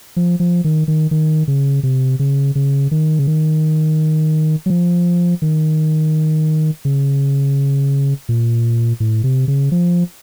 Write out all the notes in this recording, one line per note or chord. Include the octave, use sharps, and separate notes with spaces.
F3
F3
D#3
D#3
D#3
C#3
C3
C#3
C#3
D#3
C#3
D#3
F#3
F3
D#3
C#3
A#2
A2
C3
C#3
F3